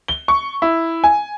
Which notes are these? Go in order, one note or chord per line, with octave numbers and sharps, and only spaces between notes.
G7
C#6
E4
G#5